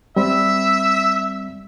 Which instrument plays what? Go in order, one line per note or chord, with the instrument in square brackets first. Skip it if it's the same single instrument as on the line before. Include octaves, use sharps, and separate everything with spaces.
[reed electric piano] G3 C4 [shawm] E5